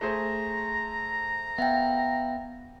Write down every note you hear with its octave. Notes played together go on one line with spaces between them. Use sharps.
A3 G#4 C5 A#5
B3 E5 F5 G5